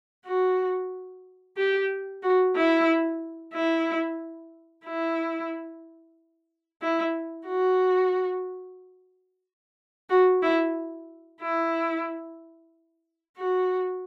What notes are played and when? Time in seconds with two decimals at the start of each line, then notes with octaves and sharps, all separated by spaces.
0.26 F#4
1.57 G4
2.23 F#4
2.55 E4
3.54 E4
4.85 E4
6.82 E4
7.47 F#4
10.10 F#4
10.42 E4
11.41 E4
13.37 F#4